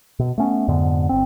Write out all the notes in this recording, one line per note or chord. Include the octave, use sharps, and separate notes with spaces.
B2
A3 B3 C#4
F2 G#2 D3 B3
G1 C4